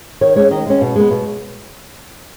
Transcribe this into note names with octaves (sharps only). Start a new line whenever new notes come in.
D#3 C#5
G#3 C#4 C#5
D#3 D#5
G#3 C#4
B2
G#3 B3
B2